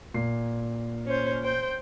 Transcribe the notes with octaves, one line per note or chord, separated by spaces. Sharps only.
A#2 C7
C#4 C5
C5 G5